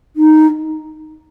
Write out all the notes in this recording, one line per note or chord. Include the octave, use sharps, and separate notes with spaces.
D#4